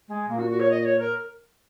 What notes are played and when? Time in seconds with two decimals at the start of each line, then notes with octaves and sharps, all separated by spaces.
0.08 G#3
0.28 A#2 A#3
0.39 F#4
0.50 F#4
0.60 C#5
0.71 D#5
0.85 C#5
0.99 A#4